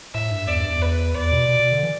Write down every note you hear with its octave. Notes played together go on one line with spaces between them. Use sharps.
A2 E5
G2
E2 D5
G2
E2
B4
E2 D5
B2
B2
B2
D3
E3